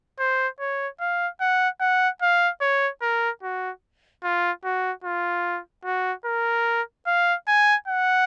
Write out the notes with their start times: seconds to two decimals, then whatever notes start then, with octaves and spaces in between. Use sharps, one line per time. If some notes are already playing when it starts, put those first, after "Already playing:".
0.19 C5
0.60 C#5
1.00 F5
1.40 F#5
1.80 F#5
2.22 F5
2.61 C#5
3.02 A#4
3.43 F#4
4.23 F4
4.64 F#4
5.04 F4
5.85 F#4
6.25 A#4
7.07 F5
7.48 G#5
7.88 F#5